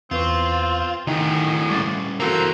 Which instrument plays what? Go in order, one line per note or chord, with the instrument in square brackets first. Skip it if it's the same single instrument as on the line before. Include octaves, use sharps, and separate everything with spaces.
[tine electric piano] E2 B4 C#6 [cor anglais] C4 [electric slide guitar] F4
[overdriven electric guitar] D2 A2 [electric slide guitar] D#3 [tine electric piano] D#4 E4 G5 [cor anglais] G#4
[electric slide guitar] G3 C#4 [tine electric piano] C#6 D6 A6
[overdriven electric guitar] E3 A#3 [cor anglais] C4 [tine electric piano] F#4 A4 A#4 [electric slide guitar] A#5